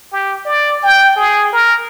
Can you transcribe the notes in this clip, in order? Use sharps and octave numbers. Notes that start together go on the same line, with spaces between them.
G4
D5
G5
G#4
A#4